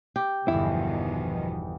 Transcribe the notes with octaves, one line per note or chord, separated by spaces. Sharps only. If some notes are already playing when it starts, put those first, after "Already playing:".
G4
G1 E2 B2 D#3 F3 E4